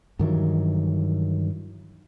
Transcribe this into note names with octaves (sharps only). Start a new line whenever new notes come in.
G2 D#3 E3 F#3